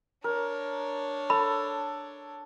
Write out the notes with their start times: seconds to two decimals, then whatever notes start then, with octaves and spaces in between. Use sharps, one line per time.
0.24 D4 A#4 C#5
1.30 A4 B5